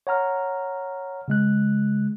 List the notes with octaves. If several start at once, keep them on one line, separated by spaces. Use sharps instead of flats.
C#5 F#5 A#5 F6
C#3 G#3 F#6